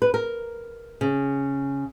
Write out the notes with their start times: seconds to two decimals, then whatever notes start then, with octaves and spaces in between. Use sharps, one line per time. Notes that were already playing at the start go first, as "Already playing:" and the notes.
0.02 B4
0.14 A#4
1.01 C#3